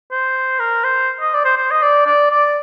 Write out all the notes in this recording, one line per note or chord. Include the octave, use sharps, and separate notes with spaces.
C5
A#4
C5
D#5
D5
C5
C5
D#5
D5
D5
D5